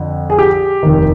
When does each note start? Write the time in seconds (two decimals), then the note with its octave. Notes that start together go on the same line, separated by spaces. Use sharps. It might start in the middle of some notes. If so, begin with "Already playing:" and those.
Already playing: F2 D3
0.30 G#4
0.39 G4
0.83 F1 D#2 D#3